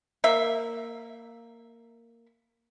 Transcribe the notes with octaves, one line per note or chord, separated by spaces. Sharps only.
A#3 E5